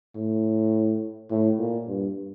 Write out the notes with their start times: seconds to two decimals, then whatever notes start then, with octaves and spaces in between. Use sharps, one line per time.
0.16 A2
1.30 A2
1.59 A#2
1.87 G2